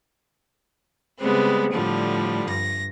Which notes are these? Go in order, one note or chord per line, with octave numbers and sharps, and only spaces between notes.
C#3 G3 G#3 B3 C4
A2 D3 F3 G3
G2 A#6